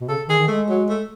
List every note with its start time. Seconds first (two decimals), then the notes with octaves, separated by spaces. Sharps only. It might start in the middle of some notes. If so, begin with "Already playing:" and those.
0.01 B2
0.08 C#3 A4
0.28 D#3 G#4
0.38 D#3
0.48 G#3 A3
0.69 F#3
0.89 A3